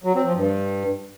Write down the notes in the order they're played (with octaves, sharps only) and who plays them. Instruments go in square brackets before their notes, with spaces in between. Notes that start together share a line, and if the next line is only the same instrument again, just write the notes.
[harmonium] F#3
C4
F3
G2